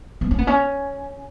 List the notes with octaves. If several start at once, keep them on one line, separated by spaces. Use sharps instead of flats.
B3
C#4
B3
C#4